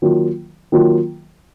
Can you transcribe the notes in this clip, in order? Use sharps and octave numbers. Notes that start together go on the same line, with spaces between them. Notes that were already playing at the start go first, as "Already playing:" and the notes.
D#3 F#3 A#3 F4
D#3 F#3 A#3 F4